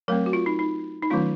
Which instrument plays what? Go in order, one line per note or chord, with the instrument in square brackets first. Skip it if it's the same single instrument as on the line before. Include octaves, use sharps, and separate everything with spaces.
[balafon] F#3 A3 C4 A#4
F#4
F4
D#4
D#4
D#4
D#3 F#3 A3 C#4 F4